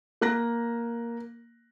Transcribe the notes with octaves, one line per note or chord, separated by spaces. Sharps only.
A#3 F#6 A#6